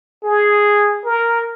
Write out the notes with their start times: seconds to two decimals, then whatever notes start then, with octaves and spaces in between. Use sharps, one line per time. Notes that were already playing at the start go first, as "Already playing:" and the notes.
0.24 G#4
1.04 A#4